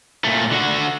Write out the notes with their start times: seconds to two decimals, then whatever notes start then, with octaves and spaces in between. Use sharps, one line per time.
0.24 A#2 A3
0.51 D3 F#4